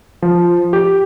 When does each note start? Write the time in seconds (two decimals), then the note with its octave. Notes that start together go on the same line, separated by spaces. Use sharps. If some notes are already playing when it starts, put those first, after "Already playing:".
0.22 F3
0.73 G4